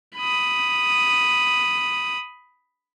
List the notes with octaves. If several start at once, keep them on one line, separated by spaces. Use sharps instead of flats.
B5 D#6